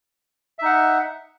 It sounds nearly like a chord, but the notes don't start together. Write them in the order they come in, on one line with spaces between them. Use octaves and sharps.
E5 D#4 F#5